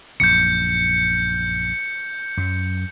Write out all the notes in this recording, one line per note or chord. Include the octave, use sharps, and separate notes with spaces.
A#1 F#2 G6 C#7
F#2 F#3